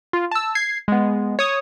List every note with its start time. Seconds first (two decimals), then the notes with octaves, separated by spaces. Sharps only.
0.13 F4
0.31 A5 E6
0.55 G#6 C7
0.88 G#3 B3
1.39 C#5 D#6